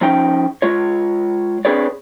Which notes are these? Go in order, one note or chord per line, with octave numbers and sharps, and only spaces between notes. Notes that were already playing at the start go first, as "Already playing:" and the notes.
F3 C#4 D#4 G5
G#3 F4 C#5
C4 D4 G#4 B4 C#5 D5